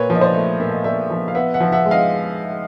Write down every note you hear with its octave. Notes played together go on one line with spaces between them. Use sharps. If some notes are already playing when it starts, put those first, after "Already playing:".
Already playing: A#2 B4 C#5
F3
D#5
C5 D5
A3
A#2 E5
D#5
A#2 D5 E5
F3
F5
B3 E5 F#5
E5 F#5
F3
E5 F#5
G#3
D#5 F5